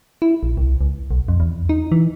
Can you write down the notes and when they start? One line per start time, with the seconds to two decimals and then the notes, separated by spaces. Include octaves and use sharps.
0.22 E4
0.43 A#1
0.57 C2
0.81 C#2
1.11 B1
1.28 F2
1.40 E2
1.69 D#4
1.92 E3